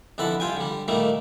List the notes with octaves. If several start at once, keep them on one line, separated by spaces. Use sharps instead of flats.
F2 D3 E3 A4 F#5 B5
G2 F4 G5 G#5
D3 G3
A#2 D#3 G3 A3 A#3